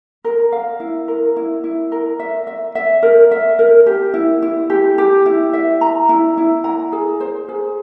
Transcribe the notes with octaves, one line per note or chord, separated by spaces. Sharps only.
A#4
F5
E4
A#4
E4
E4
A#4
E5
E5
E5
A#4
E5
A#4
G4
E4
E4
G4
G4
E4
E5
A#5
E4
E4
A#5
G#4
C5
G#4